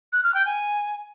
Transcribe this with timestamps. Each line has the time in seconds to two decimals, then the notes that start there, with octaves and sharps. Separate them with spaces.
0.13 F#6
0.24 F6
0.34 G5
0.45 G#5